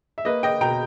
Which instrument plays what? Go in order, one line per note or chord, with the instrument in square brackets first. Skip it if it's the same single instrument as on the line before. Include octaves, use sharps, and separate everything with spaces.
[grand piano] E5
A#3 B4 D#5
D#5 G5
B2 G5 A#5